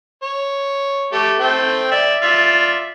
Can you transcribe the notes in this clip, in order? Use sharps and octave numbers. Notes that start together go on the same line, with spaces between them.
C#5
A3 G4
A3 C4 G5
D5 E5
F4 D5 E5